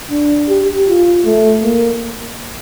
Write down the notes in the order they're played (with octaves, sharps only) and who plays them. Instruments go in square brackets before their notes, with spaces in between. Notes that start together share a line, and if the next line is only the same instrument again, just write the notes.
[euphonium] D4
G4
F4
A3
A#3